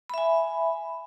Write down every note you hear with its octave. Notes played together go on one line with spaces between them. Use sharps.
E5 G#5 B5